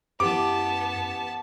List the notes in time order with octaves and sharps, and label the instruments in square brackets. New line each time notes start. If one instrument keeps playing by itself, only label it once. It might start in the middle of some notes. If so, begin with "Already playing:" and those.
[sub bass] F#2 [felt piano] E3 G4 [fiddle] B3 A5 [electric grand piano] D6